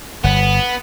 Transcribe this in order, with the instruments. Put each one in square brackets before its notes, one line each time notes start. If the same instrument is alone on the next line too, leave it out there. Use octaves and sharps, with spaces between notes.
[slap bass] G1 [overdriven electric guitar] B3